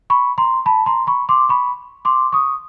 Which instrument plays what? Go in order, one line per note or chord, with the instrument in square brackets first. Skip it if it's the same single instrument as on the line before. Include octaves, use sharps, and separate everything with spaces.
[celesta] B5 C#6
A#5 C6
A5 B5
A#5 C6
B5 C#6
C6 D6
B5 C#6
C6 D6
C#6 D#6